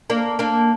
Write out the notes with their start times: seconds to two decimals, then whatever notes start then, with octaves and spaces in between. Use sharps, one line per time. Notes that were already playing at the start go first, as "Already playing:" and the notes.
0.10 A#3 D4
0.39 A#3 D4